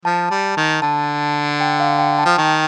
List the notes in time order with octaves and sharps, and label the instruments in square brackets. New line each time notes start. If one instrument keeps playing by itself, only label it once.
[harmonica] F3 [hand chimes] A5
[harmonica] G3
D#3
[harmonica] D3 [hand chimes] A5
[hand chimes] G5
F5
G5
A5
[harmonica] F3
[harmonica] D#3 [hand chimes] G5